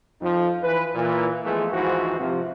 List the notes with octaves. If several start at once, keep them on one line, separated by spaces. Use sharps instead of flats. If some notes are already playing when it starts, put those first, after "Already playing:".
F2 F3 D#4
E3 B4
A#2 E3
E3 F3 G#3 A3 B3 F4
D#2 G#2 E3 F3 F#4 C5
C3 F3